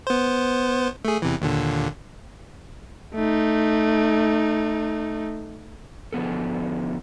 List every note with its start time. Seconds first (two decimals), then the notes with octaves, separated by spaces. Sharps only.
0.07 B3 C5
1.05 A3 G#4
1.22 E2 C3 E3
1.42 D#2 A#2 D3
3.15 A3 D#4
6.13 D3 F3 B3 A4